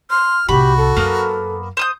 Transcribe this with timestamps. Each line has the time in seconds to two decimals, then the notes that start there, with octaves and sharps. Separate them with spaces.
0.11 C6 F6
0.49 C2 A2 F#4 G4 B5
0.77 A4
0.97 F#2 A#3 B3 A#4
1.77 C5 D#6 G6